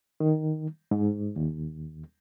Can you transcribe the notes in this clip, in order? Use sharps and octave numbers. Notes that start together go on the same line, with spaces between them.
D#3
G#2
D#2